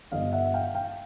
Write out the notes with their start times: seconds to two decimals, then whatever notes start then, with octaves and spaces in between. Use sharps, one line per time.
0.12 G1 G2 D3 D#5 F5
0.32 E5 F#5
0.54 F5 G5
0.75 F5 G5